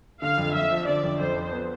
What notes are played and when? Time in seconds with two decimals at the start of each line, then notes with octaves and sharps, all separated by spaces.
0.22 D3 F5
0.38 F2
0.54 F2 E5
0.71 F3
0.87 D3 D5
1.04 F2
1.20 F2 C5
1.36 F3
1.52 B3